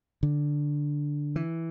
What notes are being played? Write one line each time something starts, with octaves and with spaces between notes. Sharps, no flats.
D3
E3